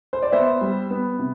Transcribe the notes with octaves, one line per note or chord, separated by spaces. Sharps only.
C5
D5
B3 C5 E5
G3
B3
C3